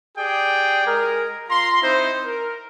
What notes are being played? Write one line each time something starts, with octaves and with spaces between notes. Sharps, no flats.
G4 G#4 D5 G5
G#3 G#4 A#4
F4 A#5 C6
C4 D#4 E4 C5
A#4